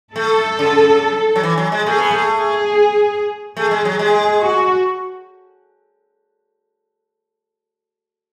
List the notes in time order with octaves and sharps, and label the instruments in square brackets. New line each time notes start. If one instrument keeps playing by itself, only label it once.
[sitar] A3 [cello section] A4
[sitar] C#3
F#3
E3
F#3
G#3
[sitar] A3 [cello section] G#4
[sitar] B3
A3
[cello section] G#4
[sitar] A3 [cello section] G#4
[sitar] G#3
F#3
[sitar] G#3 [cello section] G#4
[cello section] F#4